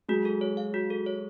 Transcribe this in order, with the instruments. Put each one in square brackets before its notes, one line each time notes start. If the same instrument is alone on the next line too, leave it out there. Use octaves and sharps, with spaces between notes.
[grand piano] F#3 G#3 [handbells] F#4
[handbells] A4
C#5
F5
F#4
A4
C#5